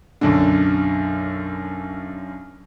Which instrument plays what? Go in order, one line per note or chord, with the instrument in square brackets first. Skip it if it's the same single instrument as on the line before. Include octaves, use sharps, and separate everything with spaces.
[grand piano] B1 F#2 D3